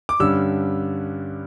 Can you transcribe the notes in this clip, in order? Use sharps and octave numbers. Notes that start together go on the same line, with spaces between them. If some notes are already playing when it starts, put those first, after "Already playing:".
D6
G2 D3 G3 C#4 E6